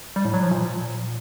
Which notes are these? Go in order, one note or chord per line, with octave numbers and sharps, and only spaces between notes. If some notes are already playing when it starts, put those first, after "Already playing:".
G3
A2
F#3
F3
A#2